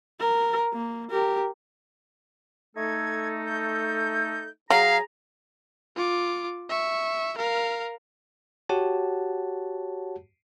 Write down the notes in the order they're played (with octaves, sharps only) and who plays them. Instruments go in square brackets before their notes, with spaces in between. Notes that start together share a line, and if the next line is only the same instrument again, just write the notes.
[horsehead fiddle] A#4
A#3
G4 A#4
[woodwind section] A3 D#4 A4 [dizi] G#6
[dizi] G6
[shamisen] F#3 [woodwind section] G#4 A#5 [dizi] C#5 [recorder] F5
[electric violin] F4 D6
E5 C#6
A#4 F5
[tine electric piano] F#4 G4 C#5 F#5 A5